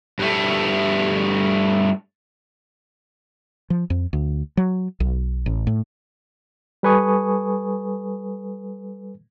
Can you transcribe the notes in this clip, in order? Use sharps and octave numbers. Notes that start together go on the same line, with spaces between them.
G2 A3
F3
F2
D2
F#3
B1
A1
A2
G3 A4 B4 G#5 C#6 D#6